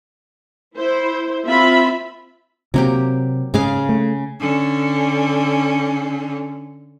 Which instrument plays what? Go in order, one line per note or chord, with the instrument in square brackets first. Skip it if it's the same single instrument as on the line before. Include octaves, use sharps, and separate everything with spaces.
[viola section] E4 C5
C4 F4 E5 B5
[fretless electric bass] C3 C4 [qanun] F#3 A#3 G4
[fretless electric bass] G#2 G#3 [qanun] C#3 G#4 F5
[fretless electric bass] A3
[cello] D3 C#4